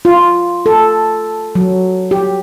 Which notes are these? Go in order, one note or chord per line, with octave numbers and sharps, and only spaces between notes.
F4
A4
F#3
G4